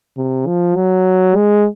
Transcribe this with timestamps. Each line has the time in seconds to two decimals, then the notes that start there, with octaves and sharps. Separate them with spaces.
0.17 C3
0.47 F3
0.77 F#3
1.36 G#3